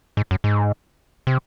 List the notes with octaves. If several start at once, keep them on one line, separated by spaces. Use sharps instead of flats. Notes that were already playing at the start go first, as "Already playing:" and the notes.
G#2
F#2
G#2
C3